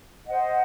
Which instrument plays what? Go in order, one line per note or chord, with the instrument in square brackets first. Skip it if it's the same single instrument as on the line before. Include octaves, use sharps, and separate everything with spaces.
[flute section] C5 D#5 F#5